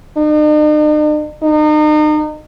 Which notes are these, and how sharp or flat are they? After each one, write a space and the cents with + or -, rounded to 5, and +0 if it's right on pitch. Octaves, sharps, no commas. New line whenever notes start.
D#4 -45
D#4 -35